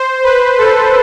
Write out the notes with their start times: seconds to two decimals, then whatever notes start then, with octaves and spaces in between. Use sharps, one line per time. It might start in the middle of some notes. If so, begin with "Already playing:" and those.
Already playing: C5
0.24 B4
0.58 A4